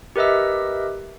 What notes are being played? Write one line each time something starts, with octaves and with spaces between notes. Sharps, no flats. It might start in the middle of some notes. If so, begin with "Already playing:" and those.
G4 A#4 B4 D#5 E5 E6